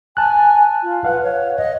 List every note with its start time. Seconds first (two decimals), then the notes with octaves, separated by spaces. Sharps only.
0.17 G#5 A5 F#6
0.83 F4
1.04 B4 F5 F#5
1.23 C#5
1.57 D#5